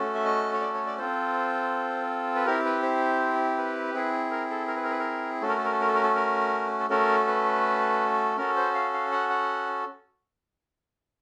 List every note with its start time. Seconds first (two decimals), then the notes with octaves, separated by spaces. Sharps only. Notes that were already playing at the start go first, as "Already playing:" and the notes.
Already playing: A3 C#4 F#4 A4
0.15 E5
0.25 D#5
0.53 C#5
0.61 D5
0.74 C#5
0.86 D5
0.98 C4 F4 A4 C5
2.36 B4
2.46 C4 E4 G4 A#4
2.65 B4
2.83 C5
3.58 B4
3.94 C4 E4 G#4
4.31 A#4
4.50 A4
4.67 A#4
4.76 B4
4.83 A#4
4.91 B4
4.99 A#4
5.42 A3 C#4 F#4 A4
5.49 A#4
5.58 A4
5.65 A#4
5.72 A4
5.81 A#4
5.88 A4
5.95 A#4
6.03 A4
6.16 A#4
6.79 A4
6.90 A3 C#4 F#4 A4 A#4
7.27 B4
8.37 C#4 F#4 A4 A#4
8.56 C5
8.75 F5
8.93 F5
9.12 F#5
9.30 F#5